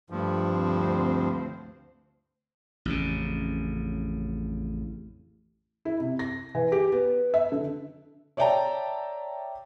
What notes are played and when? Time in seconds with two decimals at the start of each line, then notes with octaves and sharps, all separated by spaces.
0.10 G2 F3 A3
0.50 D2 C4 C5
2.85 A1 F2 C#3
5.85 E4
6.00 C3
6.19 A#6
6.55 E3
6.72 G4
6.92 B3
7.34 E5
7.52 D3
8.37 C#5 D5 E5 G5 A5 A#5